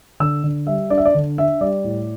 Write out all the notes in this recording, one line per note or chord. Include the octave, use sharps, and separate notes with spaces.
D3 E6
D3
G3 E5
D4 D5
E5
D5
D3
D4 E5
G3 D5
A2